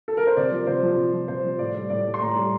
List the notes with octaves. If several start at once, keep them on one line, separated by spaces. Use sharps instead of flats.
A4
A#4
C5
C3 D5
F3
C3 C5
F3
C3
F3
C3 C5
F3
A2 D5
G3
A2 D5
G3
C6
A2 A#5
G3